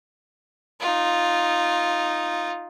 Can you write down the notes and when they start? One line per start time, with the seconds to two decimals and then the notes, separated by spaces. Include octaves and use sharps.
0.80 D#4 F4